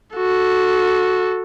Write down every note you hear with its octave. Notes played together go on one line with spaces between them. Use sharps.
F#4 A4